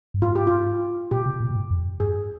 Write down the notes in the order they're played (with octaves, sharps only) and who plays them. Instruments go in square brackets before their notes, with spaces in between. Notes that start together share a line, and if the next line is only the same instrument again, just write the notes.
[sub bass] G2
[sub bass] G#2 [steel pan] F4
[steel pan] G4
F4
[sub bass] A#2 [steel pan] G4
[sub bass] C3
A#2
A#2
G#2
F2
[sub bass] G2 [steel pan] G#4